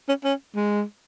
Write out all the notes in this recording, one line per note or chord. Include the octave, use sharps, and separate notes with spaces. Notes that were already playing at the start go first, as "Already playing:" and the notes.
C#4
C#4
G#3